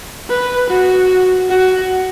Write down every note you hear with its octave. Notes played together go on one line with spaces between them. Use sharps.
B4
F#4
F#4